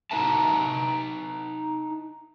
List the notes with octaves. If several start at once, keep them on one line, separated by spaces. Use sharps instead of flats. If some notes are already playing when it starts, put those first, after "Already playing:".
D#4 B4 E5 A5